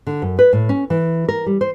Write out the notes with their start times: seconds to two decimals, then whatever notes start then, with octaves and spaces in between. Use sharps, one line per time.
0.07 D3
0.22 F#2
0.39 B4
0.53 A2
0.69 C#4
0.90 E3
1.28 A#4
1.46 G3
1.61 C5